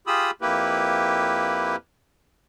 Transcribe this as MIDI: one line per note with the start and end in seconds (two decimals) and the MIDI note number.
0.07 0.31 65
0.07 0.31 67
0.07 0.31 68
0.07 0.31 83
0.07 0.31 87
0.07 0.31 88
0.42 1.76 41
0.42 1.76 58
0.42 1.76 64
0.42 1.76 67
0.42 1.76 71